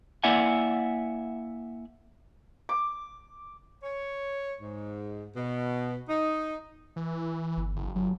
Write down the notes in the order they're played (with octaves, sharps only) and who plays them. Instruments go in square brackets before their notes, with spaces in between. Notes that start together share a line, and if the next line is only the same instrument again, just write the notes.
[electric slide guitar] A#3 E4 D5 E5 F#5 G#5
[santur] D6
[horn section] C#5
G#2
B2
D#4
[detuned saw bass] E3
[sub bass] G1
[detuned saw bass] F#1
[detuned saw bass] G1 [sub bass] F#3